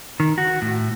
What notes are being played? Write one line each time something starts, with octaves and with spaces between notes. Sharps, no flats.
D#3
F#4
A2